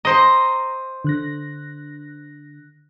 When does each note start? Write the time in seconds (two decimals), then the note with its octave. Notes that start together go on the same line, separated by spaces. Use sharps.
0.05 C5 D#5 A#5
1.04 D3 F#6 A#6